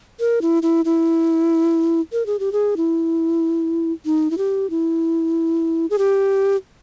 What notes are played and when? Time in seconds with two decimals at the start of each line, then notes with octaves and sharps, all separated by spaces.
0.20 A#4
0.42 E4
0.63 E4
0.85 E4
2.12 A#4
2.26 G#4
2.40 G4
2.52 G#4
2.77 E4
4.06 D#4
4.31 E4
4.38 G4
4.70 E4
5.90 G#4
5.98 G4